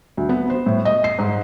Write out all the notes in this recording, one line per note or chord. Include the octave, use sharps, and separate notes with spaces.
D2
B3
C5
A2
D#5
C7
G#2